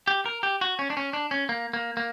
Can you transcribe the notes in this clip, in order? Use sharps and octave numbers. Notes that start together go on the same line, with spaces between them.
G4
A#4
G4
F#4
C#4
D4
C#4
D4
C#4
A#3
A#3
A#3